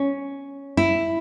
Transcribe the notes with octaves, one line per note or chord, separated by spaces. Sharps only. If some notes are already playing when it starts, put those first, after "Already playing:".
Already playing: C#4
E4